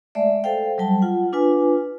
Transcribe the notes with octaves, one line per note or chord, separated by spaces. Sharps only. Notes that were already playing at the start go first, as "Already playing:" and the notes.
G#3 A3 D5 E5
A4 C5 F5 G5
F#3 G3 G5 A5
F4 F#5
D4 F4 B4 G#5